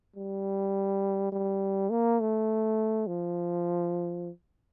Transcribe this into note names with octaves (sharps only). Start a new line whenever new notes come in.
G3
G3
A#3
A3
F3